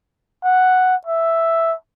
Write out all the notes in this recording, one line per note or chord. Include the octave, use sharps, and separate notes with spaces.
F#5
E5